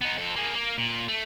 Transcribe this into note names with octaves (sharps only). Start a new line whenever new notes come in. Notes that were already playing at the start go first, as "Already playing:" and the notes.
B3 D#4
F2 A4
A#3 G#4
A#3
A#2
A3